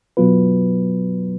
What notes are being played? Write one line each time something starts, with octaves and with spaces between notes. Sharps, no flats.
B2 F#3 B3 F4 B4